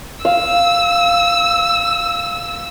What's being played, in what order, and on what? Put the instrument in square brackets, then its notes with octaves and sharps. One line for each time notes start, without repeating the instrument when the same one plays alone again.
[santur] F5 [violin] E6